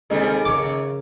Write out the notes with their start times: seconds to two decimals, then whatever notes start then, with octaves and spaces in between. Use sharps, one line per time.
0.10 D#2 C3 D#3 G3 G#3 D#4 A4
0.45 D#2 C#3 A#4 C#5 D6